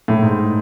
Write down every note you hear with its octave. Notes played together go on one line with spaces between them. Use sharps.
A2
G#2